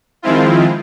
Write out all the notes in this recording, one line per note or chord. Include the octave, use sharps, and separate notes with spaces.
D#3 F3 G#3 C4 E4 F4